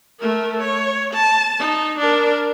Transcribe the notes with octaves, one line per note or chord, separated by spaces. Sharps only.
A3 A#4
C#5
A5
D#4
D4 A#4